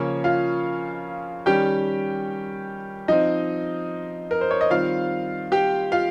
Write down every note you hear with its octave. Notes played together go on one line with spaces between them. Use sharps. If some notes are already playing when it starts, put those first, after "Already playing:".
Already playing: C#3 F3 A#3 C#4 C#5
F4 F5
D#3 G3 C#4 G4 G5
F3 C4 D#4 D#5
A#4
C5
C#5
D#5
D#3 G3 C4 F4 F5
G4 G5
F4 F5